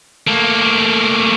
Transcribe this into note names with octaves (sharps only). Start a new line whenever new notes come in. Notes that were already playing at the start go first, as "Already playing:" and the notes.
A3 A#3